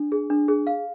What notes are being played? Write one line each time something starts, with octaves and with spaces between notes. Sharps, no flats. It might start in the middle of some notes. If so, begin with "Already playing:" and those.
Already playing: D4
G#4
D4
G#4
F5